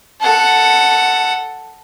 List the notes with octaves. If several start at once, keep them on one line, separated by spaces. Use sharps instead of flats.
A4 F#5